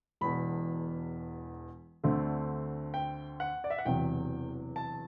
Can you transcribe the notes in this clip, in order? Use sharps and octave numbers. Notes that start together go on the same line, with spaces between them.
E1 E2 B2 B5
D2 D3 A3 C4
G5
F#5
D5
E5
F#5
E1 E2 C3 F#3 G5
A5